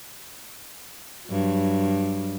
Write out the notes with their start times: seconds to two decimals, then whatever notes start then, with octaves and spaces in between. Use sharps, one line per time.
1.28 G2 F#3